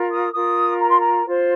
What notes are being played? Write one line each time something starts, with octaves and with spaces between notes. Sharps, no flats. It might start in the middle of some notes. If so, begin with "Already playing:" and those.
Already playing: F4 A#4
D#6
F4 A#4 D#6
A#5
C6
A#5
F4 C5